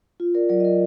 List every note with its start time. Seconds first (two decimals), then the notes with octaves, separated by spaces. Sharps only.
0.20 F4
0.35 A#4 D5
0.49 F#3 A#4 D5
0.60 D#5
0.64 A#4 D5